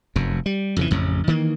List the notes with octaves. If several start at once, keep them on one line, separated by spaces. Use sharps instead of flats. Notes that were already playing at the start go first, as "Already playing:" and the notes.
F1 F#2
G3
F2 C#3 E3
A1 F2 C#3
D#3 E3 A#3